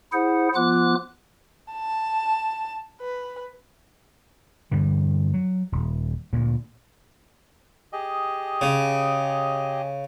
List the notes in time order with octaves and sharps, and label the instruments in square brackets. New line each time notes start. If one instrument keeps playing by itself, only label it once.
[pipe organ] E4 G#4 C5 F#5
F3 B3 F4 D6 F#6
[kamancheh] A5
B4
[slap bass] G2 D3 E3
F#3
D#1
D2 A#2
[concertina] G4 G#4 D#5
[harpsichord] C#3